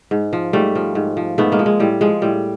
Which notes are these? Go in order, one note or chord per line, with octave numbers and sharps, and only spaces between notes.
G#2
F3
G#2 G3 A3
F3
G#2
F3
G#2 A3 B3
G#3 A#3
F3
G#3
A2 G3
F3 G#3
A2 G3